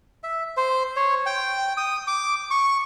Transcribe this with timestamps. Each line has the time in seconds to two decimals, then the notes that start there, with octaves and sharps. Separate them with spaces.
0.24 E5
0.57 C5
0.96 C#5
1.26 G5
1.77 D#6
2.07 D6
2.51 C#6